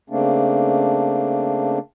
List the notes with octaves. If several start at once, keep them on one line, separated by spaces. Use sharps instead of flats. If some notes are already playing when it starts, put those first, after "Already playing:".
C#3 A3 A#3 C4 D4